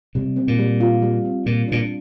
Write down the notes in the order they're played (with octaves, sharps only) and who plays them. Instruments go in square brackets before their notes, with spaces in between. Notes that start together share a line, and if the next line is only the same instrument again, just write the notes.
[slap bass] C3 [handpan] G3
[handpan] C4
[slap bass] A#2
[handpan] G3
F4
G3
C4
[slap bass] A#2 [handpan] G3
[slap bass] A#2 [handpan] D4